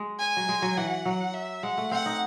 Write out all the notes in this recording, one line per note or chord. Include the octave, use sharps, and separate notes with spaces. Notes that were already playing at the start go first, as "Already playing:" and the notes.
Already playing: G#3
G#5
F#3
G#3
F#3
E3 F#5
F#3
E5
G#3 F#5
A3
C4 F#5
D#4